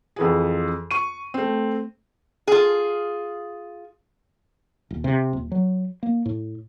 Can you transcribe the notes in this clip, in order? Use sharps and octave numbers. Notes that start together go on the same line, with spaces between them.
F2 E3 G#4
C#6 D#7
A3 C4
F4 G#4
D#1
C3
D#1
F#3
A#3
A2